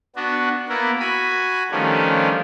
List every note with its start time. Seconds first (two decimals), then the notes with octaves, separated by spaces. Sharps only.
0.16 B3 D4 F#4
0.69 A#3 B3 E4 A#4
0.99 F#4 G#5 B5
1.71 D#3 F3 G3 A3 C#4 D4